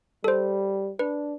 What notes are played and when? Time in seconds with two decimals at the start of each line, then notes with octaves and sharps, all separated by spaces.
0.24 G3 A4 C5
0.99 D4 B4